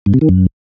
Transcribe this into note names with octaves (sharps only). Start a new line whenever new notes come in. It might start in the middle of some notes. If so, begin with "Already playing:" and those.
G2
C3
D#3
F#2